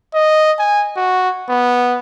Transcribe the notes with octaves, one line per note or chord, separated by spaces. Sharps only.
D#5
G#5
F#4
B3